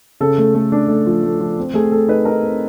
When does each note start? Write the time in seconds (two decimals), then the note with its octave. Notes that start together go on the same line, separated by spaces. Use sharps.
0.21 C#3 A4
0.38 A3
0.55 A3
0.72 D4
0.88 A3
1.06 F3
1.23 A3
1.40 F3
1.58 C4
1.74 A3 G#4
1.92 A3 A4
2.08 D#4 B4
2.25 D#4 A#4
2.43 C4